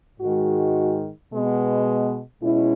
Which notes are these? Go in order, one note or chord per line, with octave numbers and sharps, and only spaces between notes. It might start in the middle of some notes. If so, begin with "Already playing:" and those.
G#2 D#3 G#3 F#4
B2 G#3 B3
B2 G#3 C#4 E4